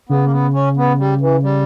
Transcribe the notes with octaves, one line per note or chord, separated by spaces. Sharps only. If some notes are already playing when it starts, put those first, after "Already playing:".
C#3 B3
A#3
B3
C#4
B3
G3
E3
G3